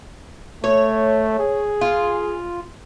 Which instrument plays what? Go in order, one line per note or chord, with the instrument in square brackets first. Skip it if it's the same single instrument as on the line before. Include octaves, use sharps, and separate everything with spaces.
[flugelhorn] A3 [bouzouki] C#5
[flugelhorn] G#4
[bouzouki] F4